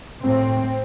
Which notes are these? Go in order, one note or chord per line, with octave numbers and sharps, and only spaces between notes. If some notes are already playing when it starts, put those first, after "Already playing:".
A2 C4